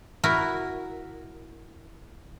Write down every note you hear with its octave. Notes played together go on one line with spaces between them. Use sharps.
E4 F#4 A#4